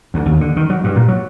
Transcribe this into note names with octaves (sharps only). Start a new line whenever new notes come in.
D2
D#2
D3
D#3
F#3
G2
A#2
F#3